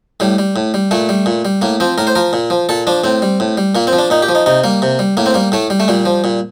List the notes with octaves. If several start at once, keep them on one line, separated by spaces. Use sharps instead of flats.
A2 G3
G3
A2
G3
A#2 A3
G3
A#2
G3
A2 A#3
F3 C4
A2 A#4
C5
F3 A#4
A#2
F3
A#2 A4
F3 D4
A2 C4
G3
A2
G3
A#2 A#3
C4
F3
D4
A#2 D#4
G4
F3
D#4
C3 D#4
G3 A#3
C3
G3
A2 A#3
C4
G3 A#3
A2 A3
G3
A3
A#2 G3
F3
A#2